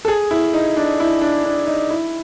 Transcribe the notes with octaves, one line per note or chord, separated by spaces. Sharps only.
A4
G#4
E4
D#4
D4
E4
D4
D4
D#4
E4